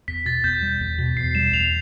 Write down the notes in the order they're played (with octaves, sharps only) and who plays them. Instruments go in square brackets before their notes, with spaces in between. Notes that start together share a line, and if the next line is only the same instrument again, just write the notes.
[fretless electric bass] E2 [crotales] B6
[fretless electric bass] B2 [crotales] A6
[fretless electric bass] E2 [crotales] G6
[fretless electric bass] G3
E2
B2
[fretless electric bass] E2 [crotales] C7
[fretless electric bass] G3 [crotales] E7
[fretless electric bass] E2 [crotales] F7